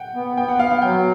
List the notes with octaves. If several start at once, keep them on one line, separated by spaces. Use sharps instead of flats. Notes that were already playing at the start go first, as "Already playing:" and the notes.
Already playing: F#5 G5
B3
B3 G5
F#5
B3 F5
F5
F#3 G5